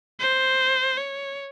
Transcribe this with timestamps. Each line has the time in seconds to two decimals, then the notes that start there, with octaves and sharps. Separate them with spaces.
0.20 C5
0.98 C#5